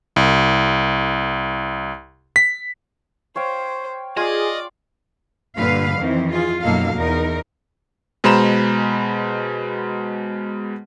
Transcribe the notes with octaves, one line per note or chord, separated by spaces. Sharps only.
C2
B6
C5 C#5 F5 G5
F4 G#4 D5 D#5 F5
G2 A#2 D3 B4 F5
F2 D#3 E3 C4
F4 G#4
F#2 B2 A#3 D#4 A4 F5
E2 D#4 A#4
B2 G#3 C5 A#5 B5 E7